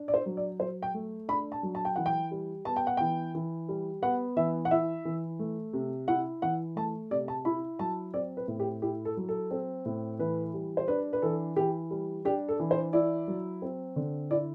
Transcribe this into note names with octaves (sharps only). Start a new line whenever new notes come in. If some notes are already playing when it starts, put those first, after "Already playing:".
Already playing: D4
D5
C5
F#3
D5
F#3 C5
G5
A3
D4 B5
A5
F#3
A5
G5
E3 F#5
G5
G3
B3 A5
G5
F#5
E3 G5
E3
G3
B3 F#5
E3 E5
F#5
E4 E5
E3
A3
C3
E4 F#5
E3 F#5
A3 A5
C3 D5
A5
E4 B5
F#3 A5
C4 D5
B4
A2
G4
E4 G4
A4
F#3
A4
C4
A2
E3 B4
G3
C5
D4 B4
B4
E3 A4
E3 G4
G3
D4 G4
A4
E3
C5
E4 D5
F#3
C4
D3
E4 D5